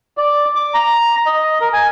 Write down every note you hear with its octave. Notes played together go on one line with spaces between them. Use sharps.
D5
D6
A#5
D#5
A#4
G#5